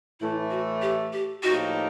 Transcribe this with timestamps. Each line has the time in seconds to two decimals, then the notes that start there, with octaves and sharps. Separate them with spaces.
0.20 A2 E3 A3 E4
0.51 F#4
0.82 G4
1.13 G4
1.43 A2 F3 A#3 D#4 F#4 G4